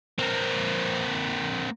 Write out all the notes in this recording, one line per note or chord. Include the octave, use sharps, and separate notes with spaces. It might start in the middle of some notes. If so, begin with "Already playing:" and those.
A#3 C4